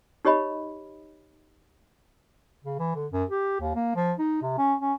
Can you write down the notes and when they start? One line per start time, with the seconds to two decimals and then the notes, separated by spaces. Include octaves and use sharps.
0.25 D#4 G4 C#5 D#5 B5
2.64 C#3
2.79 E3
2.95 D3
3.12 F#2
3.30 G4
3.61 D#2
3.75 A#3
3.96 F3
4.19 D#4
4.42 C3
4.58 C#4
4.81 C#4